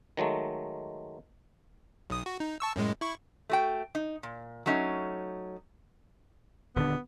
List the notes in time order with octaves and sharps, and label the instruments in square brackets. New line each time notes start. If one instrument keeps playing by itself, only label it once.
[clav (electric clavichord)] D#3 F#3 G#3 A3
[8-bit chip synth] B1 D#6
F#4
D#4
A5 C#6 E6
F#2 A2 G#3
E4 C#6
[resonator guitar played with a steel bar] A3 F#4 G5
D#4
A#2
F#3 A3 C#4 D#4
[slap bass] D#1 D3 D4 [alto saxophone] B3